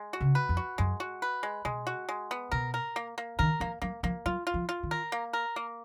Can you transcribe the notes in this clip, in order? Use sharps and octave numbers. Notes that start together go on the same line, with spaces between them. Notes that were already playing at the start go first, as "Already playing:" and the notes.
Already playing: G#3
F#4
C#3
B4
F2
F#4
F#2 G#3
F#4
B4
G#3
B2 G#3
F#4
G#3
B3
B2 A#4
A#4
A#3
A#3
D#3 A#4
F3 A#3
F#3 A#3
F3 A#3
F#3 F4
F4
F3
F4
D#3
A#4
A#3
A#4
A#3